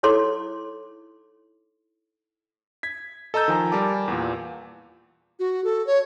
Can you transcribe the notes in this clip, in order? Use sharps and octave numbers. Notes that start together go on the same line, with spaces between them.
D#4 E4 A4 C#5 C6 D6
G#6 B6
A4 D#5 A#5 E6 G6 A6
D#3 F3 G#5 A#5
G3 A#4 G#5 A5 D6
E2 A#2
F#4
A4
C#5